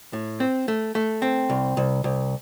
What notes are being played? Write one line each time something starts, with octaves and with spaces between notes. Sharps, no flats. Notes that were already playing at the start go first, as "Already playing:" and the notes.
A2
C4
A3
A3
C4
C2
C2
C2